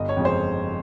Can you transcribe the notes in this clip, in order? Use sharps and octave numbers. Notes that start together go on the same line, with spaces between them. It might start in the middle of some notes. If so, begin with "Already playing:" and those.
Already playing: G1 D#5
C#5
F2 C#3 G#3 C#4
C5